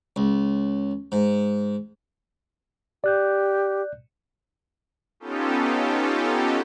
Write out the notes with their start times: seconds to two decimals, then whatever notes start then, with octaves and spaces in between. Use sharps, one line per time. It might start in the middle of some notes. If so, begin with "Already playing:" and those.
0.16 C#2
1.12 G#2
3.04 G4 D5 F#6 G6
5.20 B3 C#4 D#4 F4 G4 A4